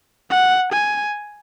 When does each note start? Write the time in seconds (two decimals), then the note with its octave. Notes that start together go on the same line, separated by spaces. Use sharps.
0.30 F#5
0.72 G#5